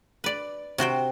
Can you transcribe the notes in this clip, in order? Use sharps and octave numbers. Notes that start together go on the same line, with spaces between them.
B4 D5
C3 F#4 C5 G5